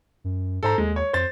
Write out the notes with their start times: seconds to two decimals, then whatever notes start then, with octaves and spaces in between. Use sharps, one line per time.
0.24 F#2
0.63 G#2 A4 C5 A#5
0.78 D#2 G#3
0.96 C#5
1.13 F2 C5 A6